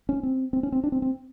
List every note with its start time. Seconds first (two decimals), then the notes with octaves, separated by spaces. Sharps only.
0.09 C#4
0.23 C4
0.53 C4
0.63 C#4
0.72 C4
0.84 D4
0.92 C4
1.02 C4